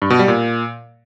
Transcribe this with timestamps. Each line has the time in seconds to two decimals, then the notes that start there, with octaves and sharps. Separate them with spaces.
0.02 G2
0.10 B2
0.19 G3
0.28 A#2